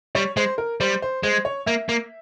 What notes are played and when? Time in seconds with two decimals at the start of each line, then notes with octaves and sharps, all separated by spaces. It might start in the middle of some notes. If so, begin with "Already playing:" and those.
0.15 G3 C#5
0.37 G#3 C5
0.58 A#4
0.80 G3 C5
1.02 C5
1.23 G#3 C5
1.45 C#5
1.66 A#3 E5
1.89 A#3